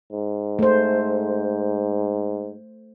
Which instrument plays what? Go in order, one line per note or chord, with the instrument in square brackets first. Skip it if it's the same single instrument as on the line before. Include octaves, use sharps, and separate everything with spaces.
[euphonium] G#2
[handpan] A3 C5